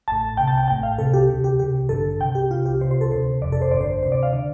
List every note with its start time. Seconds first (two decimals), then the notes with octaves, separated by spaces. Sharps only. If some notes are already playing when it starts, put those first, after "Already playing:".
0.08 A1 A2 A5
0.37 C2 C3 G5
0.48 A5
0.58 G5
0.68 A1 A2 G5
0.83 F5
0.98 C2 C3 A4
1.14 G4
1.29 D2 C3
1.44 G4
1.59 C2 C3 G4
1.89 A1 G2 D3 A4
2.19 C2 C3 G5
2.35 G4
2.51 C2 C3 F4
2.66 G4
2.81 C2 C3 C5
2.91 C5
3.01 A4
3.11 D2 C3 C5
3.42 G1 F2 C3 D5
3.52 A4
3.62 C5
3.71 A1 G2 D3 D5
3.81 C5
4.03 D2 C3 C5
4.12 D5
4.23 F5
4.33 D3 D5